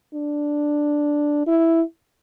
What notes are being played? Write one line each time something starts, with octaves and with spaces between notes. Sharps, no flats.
D4
E4